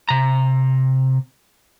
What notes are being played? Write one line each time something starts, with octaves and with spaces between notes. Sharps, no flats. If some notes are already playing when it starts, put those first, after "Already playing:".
C3 A#5